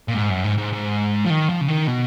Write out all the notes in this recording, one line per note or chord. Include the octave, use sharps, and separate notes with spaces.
A#2
G#2
F#2
G#2
G#2
G#2
F3
D#3
F3
C#3
D#3
B2